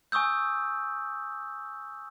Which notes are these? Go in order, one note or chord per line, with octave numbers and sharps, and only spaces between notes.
G#5 C#6 D#6 E6 G6